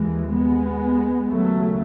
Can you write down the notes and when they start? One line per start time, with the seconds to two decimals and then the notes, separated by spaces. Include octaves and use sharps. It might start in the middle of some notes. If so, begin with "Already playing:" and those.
Already playing: D#2 E3 G#3
0.34 G#3 B3
1.29 D#2 C#3 F#3 A3